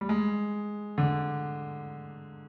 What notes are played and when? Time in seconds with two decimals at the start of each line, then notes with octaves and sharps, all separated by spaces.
0.01 G3
0.09 G#3
0.98 D3